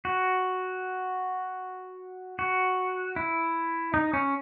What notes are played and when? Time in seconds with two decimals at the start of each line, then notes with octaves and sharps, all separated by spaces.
0.05 F#4
2.39 F#4
3.16 E4
3.94 D#4
4.13 C#4